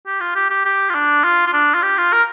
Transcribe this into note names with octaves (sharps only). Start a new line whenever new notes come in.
G4
F4
G4
G4
G4
F4
D4
F4
F4
D4
F4
G4
F4
A#4